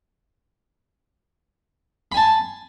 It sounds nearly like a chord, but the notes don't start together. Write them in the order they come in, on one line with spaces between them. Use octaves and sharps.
B5 G#5 A5